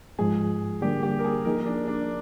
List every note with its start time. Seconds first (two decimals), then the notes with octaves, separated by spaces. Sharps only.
0.19 G#2 F3 G#3 G#4
0.81 D3 G3 A#3 D4 G4
1.03 G4
1.19 A#4
1.24 G#4
1.45 F3 A#3 D#4 G#4 A#4
1.66 D4
1.88 D4